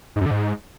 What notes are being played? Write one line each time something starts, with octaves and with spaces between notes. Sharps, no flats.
G#2
F#2
D3
G#2